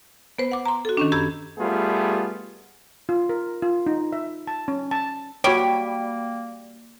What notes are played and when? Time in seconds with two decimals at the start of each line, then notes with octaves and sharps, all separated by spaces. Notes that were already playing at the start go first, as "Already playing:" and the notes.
0.38 B3 B4 C5
0.52 F#5 D6
0.66 A#5 C6
0.85 F#4 A4
0.97 D#3 C#4 D4
1.12 F#2 G4 B5 E6 G#6
1.58 G3 A3 B3 F4 G#4
3.09 F4
3.29 A#4
3.62 F4
3.87 D#4
4.12 E5
4.47 A5
4.68 C#4
4.91 A5
5.44 G3 A#3 F#4 C#5 G5 D7